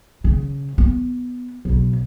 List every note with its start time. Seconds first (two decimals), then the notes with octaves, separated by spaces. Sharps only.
0.24 C#3
0.78 B3
1.65 B1 C#3